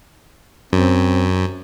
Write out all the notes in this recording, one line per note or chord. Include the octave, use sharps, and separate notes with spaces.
F#2 C4